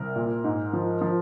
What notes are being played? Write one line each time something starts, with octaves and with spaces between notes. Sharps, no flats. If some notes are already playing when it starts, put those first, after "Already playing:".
Already playing: C2 A#4
A#2
G#2
F3
F3